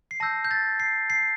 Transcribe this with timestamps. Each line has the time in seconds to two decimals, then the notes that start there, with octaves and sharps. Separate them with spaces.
0.11 C7
0.20 A5 E6 G6 A#6
0.45 G6
0.51 A6
0.80 C7
1.10 C7